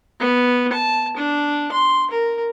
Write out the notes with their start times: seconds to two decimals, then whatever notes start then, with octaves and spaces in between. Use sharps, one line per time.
0.20 B3
0.73 A5
1.17 D4
1.72 C6
2.10 A#4